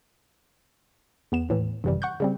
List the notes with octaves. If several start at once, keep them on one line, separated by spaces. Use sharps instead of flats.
E2 B3 E7
D#2 A2 E3
G#1 F#2 C3 E3 G3
F#5 C#6 F#6 G6
C#3 G3 C4